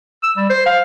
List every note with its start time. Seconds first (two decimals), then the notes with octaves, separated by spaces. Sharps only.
0.24 E6
0.37 G3
0.50 C5
0.66 F5